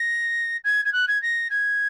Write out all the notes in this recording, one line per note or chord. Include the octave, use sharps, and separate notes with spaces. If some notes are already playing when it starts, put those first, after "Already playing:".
Already playing: A#6
G#6
G#6
F#6
G#6
A#6
G#6